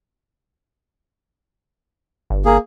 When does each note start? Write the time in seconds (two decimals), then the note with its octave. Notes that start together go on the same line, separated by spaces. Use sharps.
2.30 G1
2.46 A#3 G#4